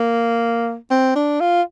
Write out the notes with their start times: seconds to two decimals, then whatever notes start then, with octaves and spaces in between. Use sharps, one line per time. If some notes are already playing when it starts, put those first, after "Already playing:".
Already playing: A#3
0.91 C4
1.16 D4
1.40 F4